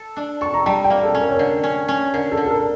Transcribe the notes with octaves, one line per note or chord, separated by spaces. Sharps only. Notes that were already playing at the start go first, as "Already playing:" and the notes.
Already playing: A4
D4
A4 C#6
A#5
G3 A5
G5
A#3
A4
C#4
A#4
C#5
D3 A#4
C#4
C#4
D3 A#4
A4
D3
A4
A#4